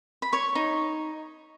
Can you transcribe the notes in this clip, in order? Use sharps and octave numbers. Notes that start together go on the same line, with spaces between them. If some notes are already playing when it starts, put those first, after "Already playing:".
B5
C#5 C#6
D#4